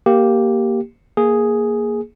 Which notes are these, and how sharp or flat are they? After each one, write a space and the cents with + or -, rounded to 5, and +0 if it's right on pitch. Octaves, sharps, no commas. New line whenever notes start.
A#3 +0 G4 -5
A#3 +0 G#4 +0